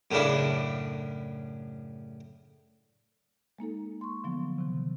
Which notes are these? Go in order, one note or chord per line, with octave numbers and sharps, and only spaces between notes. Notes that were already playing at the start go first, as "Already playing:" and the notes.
F#2 A2 C#3 D4 E4
G#3 A#3 D#4 A4
C6 C#6
D3 F3 F#3 B3
C3 D#3